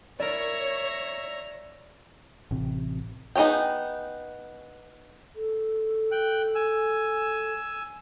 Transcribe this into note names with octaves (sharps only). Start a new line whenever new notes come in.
E4 A#4 C#5 D5 E5 A#5
A1 C3
B3 D#4 G#4 C#5 G5
A4
G5 F#6
G#5 E6